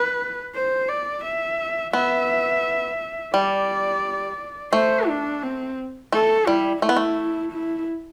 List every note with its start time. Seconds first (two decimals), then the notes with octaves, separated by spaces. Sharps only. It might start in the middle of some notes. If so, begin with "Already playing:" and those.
Already playing: B4
0.55 C5
0.89 D5
1.24 E5
1.93 B3 E5
3.34 G3 D5
4.73 A3 C5
5.08 D4
5.42 C4
6.12 A3 A4
6.47 G3 E4
6.82 A3 E4
6.89 B3
6.96 A3
7.52 E4